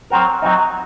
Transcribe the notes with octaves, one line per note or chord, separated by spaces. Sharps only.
F#3 C4 F#4 A#4
F#3 C4 D#4